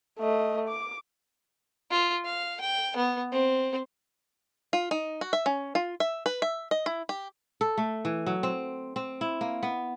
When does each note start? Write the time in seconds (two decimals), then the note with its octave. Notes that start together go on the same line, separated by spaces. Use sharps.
0.19 A3 D#5
0.69 D6
1.91 F4
2.25 F5
2.61 G5
2.97 B3
3.32 C4
4.73 F4
4.91 D#4
5.21 F#4
5.33 E5
5.46 C#4
5.75 F4
6.00 E5
6.26 B4
6.42 E5
6.71 D#5
6.86 E4
7.09 G4
7.61 A4
7.78 A3
8.05 E3
8.26 F#3
8.43 C4
8.96 C4
9.21 E4
9.41 A#3
9.63 B3